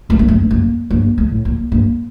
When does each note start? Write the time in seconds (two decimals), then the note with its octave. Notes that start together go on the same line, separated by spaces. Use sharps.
0.09 F#2 A3
0.19 G2 A#3
0.28 A3
0.31 F#2
0.42 G2
0.51 F#2 A#3
0.91 G2 A#3
1.18 A3
1.31 A2
1.45 A#3
1.72 G2 A#3